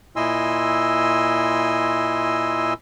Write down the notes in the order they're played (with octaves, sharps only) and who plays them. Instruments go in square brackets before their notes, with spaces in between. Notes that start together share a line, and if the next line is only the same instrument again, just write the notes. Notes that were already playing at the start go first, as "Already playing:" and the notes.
[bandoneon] A#2 E4 D#5 G#5 C6 E6